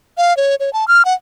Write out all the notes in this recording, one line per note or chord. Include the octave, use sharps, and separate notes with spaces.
F5
C#5
C#5
A5
F6
F#5